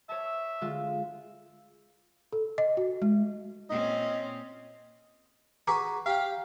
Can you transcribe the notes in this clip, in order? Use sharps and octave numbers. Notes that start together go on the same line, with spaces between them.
C#5 E5 A5
D3 G#3 F4
A4
D#5
F#4
G#3
A#2 C4 C#4 D#5
F#4 G#4 B4 A#5 D6
G4 F5 G5